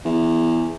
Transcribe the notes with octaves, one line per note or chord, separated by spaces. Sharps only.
E2